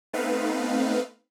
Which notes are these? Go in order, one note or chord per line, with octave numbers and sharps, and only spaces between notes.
A3 B3 C4 D#4 B4 F5